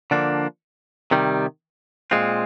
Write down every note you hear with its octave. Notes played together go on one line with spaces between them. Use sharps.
D3 F3 A#3 D4
C3 D#3 G3
A#2 G#3 C4 F4